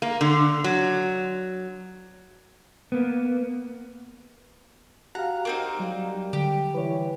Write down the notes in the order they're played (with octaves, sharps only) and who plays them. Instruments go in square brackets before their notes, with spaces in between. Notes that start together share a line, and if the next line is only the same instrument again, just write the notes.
[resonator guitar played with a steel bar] A#3
D3
F#3
[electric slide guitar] A#3 B3
[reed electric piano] F#4 G4 F5 [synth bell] F#5 F#6 [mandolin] A#5
[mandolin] A#3 C4 D#4
[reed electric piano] F#3 [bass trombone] G3
[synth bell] D3 [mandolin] G4
[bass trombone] E3 [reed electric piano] B4 C#5